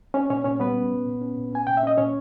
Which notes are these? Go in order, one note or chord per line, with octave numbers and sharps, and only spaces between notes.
C#4 C#5
A#2 C#4 C#5
A#2 C#4 C#5
G3 B3 B4
C#4
A#2
A#2
C#4
A#2
C#4 G#5
A#2 G5
E5
C#4 D#5
A#2 C#4 C#5